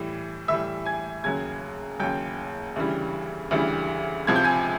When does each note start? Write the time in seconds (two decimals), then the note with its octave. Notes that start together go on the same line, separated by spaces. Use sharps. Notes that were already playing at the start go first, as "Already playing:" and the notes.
Already playing: A2 E3 G3
0.48 A2 E3 G3 E5 E6
0.85 G#5 G#6
1.24 D#2 C#3 F#3 G#5 G#6
1.99 D#2 C#3 F#3 G5 G6
2.76 D2 C#3 E3 G3
3.51 D2 C#3 E3 G3
4.27 C#2 C3 F3 G#6
4.36 G6
4.44 G#5 G#6